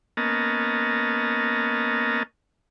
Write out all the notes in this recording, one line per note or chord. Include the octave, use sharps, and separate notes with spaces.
A#3 B3 C#4 A#4 D#5 A5